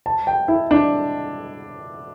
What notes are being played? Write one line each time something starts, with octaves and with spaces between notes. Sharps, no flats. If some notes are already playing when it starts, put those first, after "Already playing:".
A5
G5
E4
D4